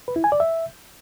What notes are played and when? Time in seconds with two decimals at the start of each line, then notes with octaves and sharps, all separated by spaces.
0.08 B4
0.16 E4
0.24 G#5
0.32 D5
0.40 E5